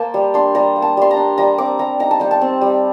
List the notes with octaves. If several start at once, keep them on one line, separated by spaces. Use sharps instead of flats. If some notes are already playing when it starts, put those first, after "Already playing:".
Already playing: A#3 C5 A5
G3
D4 C6
G3 A#5
A#3
A5
G3 C6
A#5
D4
G3 A#5
C4 D6
G3 A#5
D#4 A#5
A5
G3 G5
A5
C4
G3